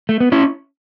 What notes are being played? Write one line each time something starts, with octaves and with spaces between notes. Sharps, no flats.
A3
B3
C#4 E4